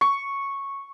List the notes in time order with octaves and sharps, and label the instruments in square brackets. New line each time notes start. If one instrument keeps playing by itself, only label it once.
[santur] C#6